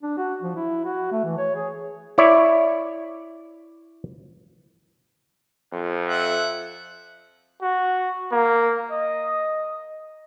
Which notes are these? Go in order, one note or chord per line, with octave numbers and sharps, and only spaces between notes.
D4
F#4
F3
E4
F#4
A3
E3
C#5
G#4
E4 C#5 D5 E5
F2
E5 F#5
F#4
A#3
D#5